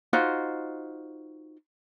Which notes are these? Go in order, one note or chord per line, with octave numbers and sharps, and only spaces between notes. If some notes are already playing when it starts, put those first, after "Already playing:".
D#4 F4 F#4 C5